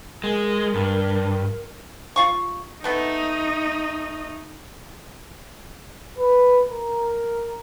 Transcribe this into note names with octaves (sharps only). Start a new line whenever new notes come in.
G#3 A#4
G2
F4 F5 C#6
A3 B3 D#4 A4
B4
A#4